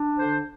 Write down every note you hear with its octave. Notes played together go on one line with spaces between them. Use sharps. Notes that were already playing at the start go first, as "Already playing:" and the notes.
Already playing: D4
D3 C5